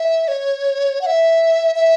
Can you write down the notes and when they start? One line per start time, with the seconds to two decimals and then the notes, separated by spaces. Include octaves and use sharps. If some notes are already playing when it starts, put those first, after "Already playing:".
Already playing: E5
0.28 C#5
1.01 F#5
1.06 E5
1.76 E5